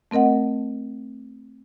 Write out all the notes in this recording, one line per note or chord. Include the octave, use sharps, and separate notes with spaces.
A3 C4 A#4 D#5 F#5